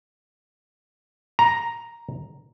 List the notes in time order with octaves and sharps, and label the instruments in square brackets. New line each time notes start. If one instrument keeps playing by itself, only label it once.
[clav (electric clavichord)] A#5